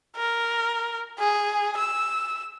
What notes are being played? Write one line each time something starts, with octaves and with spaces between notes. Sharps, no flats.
A#4
G#4
E6